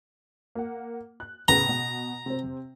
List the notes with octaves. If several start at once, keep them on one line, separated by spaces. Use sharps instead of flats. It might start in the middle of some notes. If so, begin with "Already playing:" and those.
A#3 F#5
F#6
A2 C#3 B3 A#5
B2
C3 C4